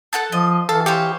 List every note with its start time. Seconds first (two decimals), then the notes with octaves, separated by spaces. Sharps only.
0.13 A4 F#5 A5
0.32 F3 D#5
0.69 E3 A4 F5
0.86 G4 C5 C#5 F5